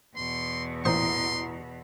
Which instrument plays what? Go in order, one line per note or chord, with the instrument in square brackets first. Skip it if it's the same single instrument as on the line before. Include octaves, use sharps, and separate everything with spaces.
[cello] E2 B2 [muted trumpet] C6
[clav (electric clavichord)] A1 A#2 C5 [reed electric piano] E4 A#5 D#6 [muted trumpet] C6